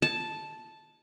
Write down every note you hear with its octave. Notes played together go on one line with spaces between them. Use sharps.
A5